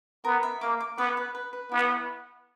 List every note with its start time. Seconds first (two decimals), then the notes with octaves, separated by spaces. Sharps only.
0.25 B3 A#4
0.43 E5
0.61 A#3 D6
0.81 D6
0.98 B3 B4
1.17 B4
1.35 B4
1.53 B4
1.72 B3 E4